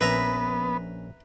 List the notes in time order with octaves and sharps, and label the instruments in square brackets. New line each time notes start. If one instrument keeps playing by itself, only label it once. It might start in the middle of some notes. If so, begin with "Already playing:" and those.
[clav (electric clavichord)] A#1 C#4 [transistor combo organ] B3 [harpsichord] B4 E5 A#5